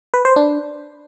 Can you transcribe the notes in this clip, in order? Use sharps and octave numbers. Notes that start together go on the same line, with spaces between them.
B4
C5
D4